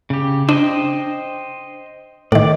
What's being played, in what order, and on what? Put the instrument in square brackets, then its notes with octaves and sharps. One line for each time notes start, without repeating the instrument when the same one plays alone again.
[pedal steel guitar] C#3 G4
[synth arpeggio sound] D4 [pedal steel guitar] C5 D#5 G5
[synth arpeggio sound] A2 D#3 [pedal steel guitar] D5